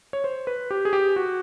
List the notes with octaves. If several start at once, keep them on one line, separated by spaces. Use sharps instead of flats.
C#5
C5
B4
G4
G#4
G4
F#4